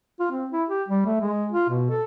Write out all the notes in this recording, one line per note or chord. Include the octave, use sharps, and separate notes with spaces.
F4
C4
E4
G4
G3
A3
G#3
F4
B2
A4